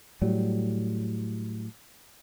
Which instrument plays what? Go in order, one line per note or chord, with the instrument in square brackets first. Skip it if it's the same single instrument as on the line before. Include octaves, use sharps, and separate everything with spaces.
[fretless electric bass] A2 F#3 G3